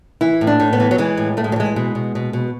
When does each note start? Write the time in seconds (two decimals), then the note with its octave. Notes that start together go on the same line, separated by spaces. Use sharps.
0.21 E3 E4
0.41 A2
0.47 D4
0.60 A2
0.73 B3
0.80 E3
0.91 F#3
0.98 E3 G#3
1.17 A2
1.37 A2 A3
1.44 G#3
1.52 F#3
1.56 E3 G#3
1.76 B2 G#3
1.95 B2
2.15 B2
2.33 B2